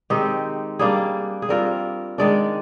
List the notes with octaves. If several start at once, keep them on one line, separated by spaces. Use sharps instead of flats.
D#3 G#3 C4 D#4 G4
G3 A#3 D4 G#4
G#4
G3 C4 F4 A#4
D#3 G#3 D4 D5